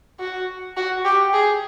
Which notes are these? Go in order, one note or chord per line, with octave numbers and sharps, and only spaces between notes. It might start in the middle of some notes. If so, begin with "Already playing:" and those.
F#4
F#4
G4
G#4